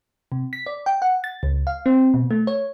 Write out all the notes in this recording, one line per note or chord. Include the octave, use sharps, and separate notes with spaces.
C3
B6
D5
G5
F#5
A6
C#2
F5
C4
B2
A3
C#5